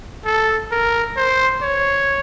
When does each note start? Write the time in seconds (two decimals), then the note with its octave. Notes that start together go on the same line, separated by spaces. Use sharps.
0.26 A4
0.71 A#4
1.17 C5
1.62 C#5